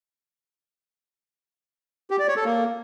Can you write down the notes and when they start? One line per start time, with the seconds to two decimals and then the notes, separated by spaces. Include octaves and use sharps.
2.10 G4
2.19 D5
2.28 C#5
2.36 A4
2.45 A#3